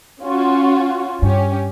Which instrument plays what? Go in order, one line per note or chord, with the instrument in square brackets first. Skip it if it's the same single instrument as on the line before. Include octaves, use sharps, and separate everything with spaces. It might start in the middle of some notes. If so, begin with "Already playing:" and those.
[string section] C#4 F4 F#4
[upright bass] G2 [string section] C#4 G4